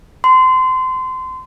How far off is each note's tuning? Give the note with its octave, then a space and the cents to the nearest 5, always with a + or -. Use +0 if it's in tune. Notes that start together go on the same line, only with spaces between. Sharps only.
C6 -25